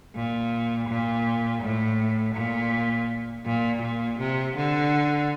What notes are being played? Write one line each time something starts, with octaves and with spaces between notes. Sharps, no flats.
A#2
A#2
A2
A#2
A#2
A#2
C3
D3